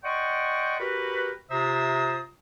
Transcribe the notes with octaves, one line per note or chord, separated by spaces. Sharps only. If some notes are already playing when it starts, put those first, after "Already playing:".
D5 D#5 F#5 G5 C6 C#6
F#4 G4 A#4 B4
C3 F4 C5 E5 A#5 D#6